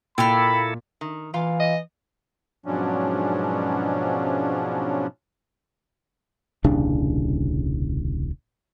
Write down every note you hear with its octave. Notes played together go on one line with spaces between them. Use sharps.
A#2 A#3 E4 A4 G5 B5 D6 F6
D#3
A#2 E3 F4 F5
D#5
G#2 B2 F3 F#3 C#4 D4
D#1 C2 C#3 D4